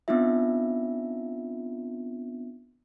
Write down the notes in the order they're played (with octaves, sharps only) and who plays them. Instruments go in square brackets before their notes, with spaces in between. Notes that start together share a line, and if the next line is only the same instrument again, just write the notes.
[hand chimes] B3 C4 D4 D#4 F4 E5